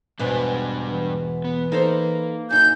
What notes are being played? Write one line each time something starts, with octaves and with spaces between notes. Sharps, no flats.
E2 G#2 B2 G3 D4 B4
E3
B3
A#3 D#4 A4 C5
F#2 D#4 G6